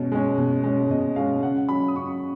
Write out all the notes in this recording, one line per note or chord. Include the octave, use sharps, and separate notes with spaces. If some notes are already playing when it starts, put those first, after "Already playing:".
Already playing: B2 G#3 C#4
G#3 C#4
B2
G#3 C#4
B2 D#5
G#3 C#4 F5
C#3 F#5
F#3 C#4 B5
D#6
C#3 C#6